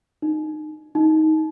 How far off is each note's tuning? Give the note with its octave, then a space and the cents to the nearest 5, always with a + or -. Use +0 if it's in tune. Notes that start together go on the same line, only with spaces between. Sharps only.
D#4 -20
D#4 +15